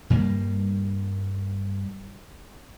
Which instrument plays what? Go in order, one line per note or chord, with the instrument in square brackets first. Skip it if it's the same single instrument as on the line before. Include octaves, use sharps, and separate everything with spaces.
[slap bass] G2 G3 A#3